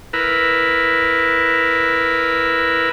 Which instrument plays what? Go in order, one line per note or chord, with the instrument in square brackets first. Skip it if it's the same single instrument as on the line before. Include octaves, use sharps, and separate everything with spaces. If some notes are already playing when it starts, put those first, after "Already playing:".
[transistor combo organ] E4 A#4 B4